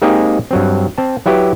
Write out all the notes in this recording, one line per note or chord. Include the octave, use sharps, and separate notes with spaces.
G#3 A#3 C4 D#4 G4 G#4
G2 F#3 C4
C4 A5
F#3 E4 G4 B4